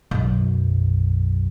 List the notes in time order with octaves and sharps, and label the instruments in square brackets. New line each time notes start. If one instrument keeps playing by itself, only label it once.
[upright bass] B1 F#2